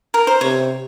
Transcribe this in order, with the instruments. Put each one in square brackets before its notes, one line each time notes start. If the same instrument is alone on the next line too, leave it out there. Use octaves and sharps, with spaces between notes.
[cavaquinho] A#4
C5
[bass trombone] C3 [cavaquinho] C#5